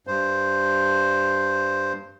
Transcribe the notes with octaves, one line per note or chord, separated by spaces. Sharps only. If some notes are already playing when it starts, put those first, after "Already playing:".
G2 C5